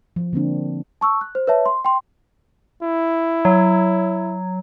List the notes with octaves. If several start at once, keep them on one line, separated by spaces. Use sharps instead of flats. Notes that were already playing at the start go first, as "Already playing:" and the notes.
F3
D3 A#3 C4 D4
A5 C#6 E6
F#6
C5
B4 C#5 E5 A5
C6
G5 C6
E4
F#3